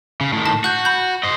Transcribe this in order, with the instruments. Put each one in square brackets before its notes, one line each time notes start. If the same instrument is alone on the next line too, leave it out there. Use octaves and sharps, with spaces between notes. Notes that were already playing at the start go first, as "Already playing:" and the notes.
[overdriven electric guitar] C#3
A2 D#3
[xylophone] A5
[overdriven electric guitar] F#4 [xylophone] F#6 G6
[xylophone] B5 G6
[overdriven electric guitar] C5 D#5